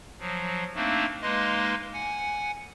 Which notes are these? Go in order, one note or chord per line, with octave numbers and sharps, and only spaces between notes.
F3 F#3
A3 A#3 C4 D4 D#4
G#3 A#3 D#4 B4 D#5 C6
F#5 G#5